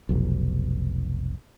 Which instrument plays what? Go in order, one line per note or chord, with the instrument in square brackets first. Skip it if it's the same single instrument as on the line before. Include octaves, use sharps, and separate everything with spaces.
[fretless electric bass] F1 B1